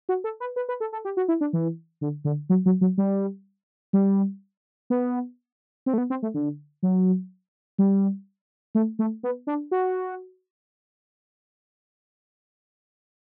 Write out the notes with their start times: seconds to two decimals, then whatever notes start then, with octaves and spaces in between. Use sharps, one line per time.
0.09 F#4
0.24 A4
0.40 B4
0.56 B4
0.69 B4
0.80 A4
0.93 A4
1.05 G4
1.17 F#4
1.28 E4
1.41 D4
1.53 E3
2.01 D3
2.25 D3
2.49 F#3
2.66 F#3
2.81 F#3
2.98 G3
3.93 G3
4.90 B3
5.86 C4
5.94 A3
5.98 B3
6.10 C4
6.23 A3
6.34 D3
6.83 F#3
7.79 G3
8.75 A3
8.99 A3
9.23 B3
9.47 D4
9.71 F#4